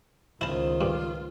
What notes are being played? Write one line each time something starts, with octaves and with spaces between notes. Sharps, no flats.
C#2 D#3 E4 F4 C5 A5
G2